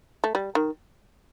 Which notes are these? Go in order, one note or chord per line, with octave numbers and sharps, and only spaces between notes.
A3
G3
D#3